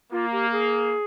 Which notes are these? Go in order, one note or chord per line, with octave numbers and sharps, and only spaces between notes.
A#3 F4
G4
G#4